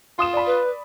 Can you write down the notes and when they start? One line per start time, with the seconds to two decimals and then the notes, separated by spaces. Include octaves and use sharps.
0.18 F4 C6 D#6 E7
0.33 D5 B5
0.46 B4